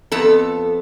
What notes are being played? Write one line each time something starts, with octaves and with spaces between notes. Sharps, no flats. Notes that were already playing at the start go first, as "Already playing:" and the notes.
F2 B3 A4